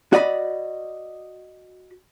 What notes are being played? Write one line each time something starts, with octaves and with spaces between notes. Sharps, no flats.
F#4 D5 D#5 B5